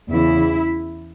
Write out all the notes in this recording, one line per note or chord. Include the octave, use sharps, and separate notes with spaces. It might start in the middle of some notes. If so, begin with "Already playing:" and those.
E2 C#3 E3 E4